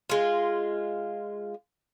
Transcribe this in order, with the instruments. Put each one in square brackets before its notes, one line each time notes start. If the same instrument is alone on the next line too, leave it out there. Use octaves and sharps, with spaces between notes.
[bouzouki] G#3 F4